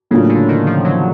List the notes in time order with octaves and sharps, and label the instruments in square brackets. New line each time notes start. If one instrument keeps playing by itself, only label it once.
[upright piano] A2 F#3 A#3 D4 F4 [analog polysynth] C#3
[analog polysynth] D3
D#3
F3
F#3